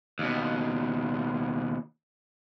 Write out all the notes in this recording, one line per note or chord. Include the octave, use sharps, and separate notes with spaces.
D#2 B2